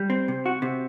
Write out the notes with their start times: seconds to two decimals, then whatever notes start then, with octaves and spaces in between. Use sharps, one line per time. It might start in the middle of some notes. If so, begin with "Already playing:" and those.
Already playing: G3
0.10 C4
0.28 C3
0.46 F#4
0.62 C3